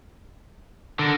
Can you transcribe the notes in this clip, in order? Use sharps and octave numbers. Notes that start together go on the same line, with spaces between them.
D3 A4 A#4